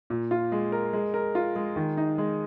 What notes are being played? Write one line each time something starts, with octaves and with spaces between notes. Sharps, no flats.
A#2
F4
G#3
A#4
G#3
A#4
F4
G#3
D#3
D#4
G#3